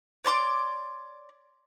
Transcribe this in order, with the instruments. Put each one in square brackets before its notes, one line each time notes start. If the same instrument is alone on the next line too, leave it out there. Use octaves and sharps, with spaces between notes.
[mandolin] C#5 D5 C6 D6